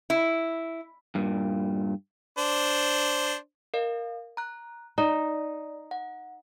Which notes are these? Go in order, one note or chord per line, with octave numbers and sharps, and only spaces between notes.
E4
G2 A#2
D4 C5
A#4 D#5 F5
A#5 F#6
D#4 D5
F#5